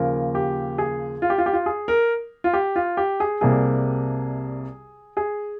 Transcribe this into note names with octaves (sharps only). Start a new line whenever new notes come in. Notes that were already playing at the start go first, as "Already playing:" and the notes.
Already playing: D#2 C#3 F3 A#3 A#4
G4
G#4
F4
G4
F4
G4
F4
G#4
A#4
F4
G4
F4
G4
G#4
C2 C3 G3 A#3 G#4
G#4